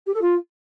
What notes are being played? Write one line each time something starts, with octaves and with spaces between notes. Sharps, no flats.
G4
A4
F4